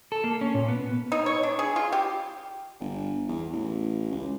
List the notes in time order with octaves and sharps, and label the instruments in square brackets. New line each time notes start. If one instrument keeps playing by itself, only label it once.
[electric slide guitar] A4
A#3
C#4
A#2
B3
[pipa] D#4
C#5
D4
G#4
F4
G4
[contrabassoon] G1
E2
A1
C#2